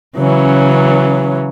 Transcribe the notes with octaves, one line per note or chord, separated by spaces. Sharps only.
C#3 E3 F#3 C#4